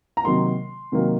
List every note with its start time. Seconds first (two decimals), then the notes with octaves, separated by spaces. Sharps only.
0.17 A#5
0.24 C3 D#3 F#3 A#3 C6
0.92 C3 D#3 F#3 A#3